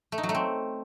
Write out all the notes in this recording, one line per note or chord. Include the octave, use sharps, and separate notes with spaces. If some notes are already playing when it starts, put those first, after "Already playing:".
A3
D#4
F#3
A3
C4